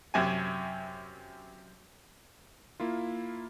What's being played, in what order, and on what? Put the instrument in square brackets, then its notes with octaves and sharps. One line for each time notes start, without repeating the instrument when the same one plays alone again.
[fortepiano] F#2 C3 G#5
[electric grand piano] A#3 E4 F4